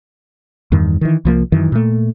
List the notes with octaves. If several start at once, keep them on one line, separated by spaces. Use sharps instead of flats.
E2 G2 D#3
D#3 E3
C2 F3 A#3
F#2 D#3 E3
A#2 A3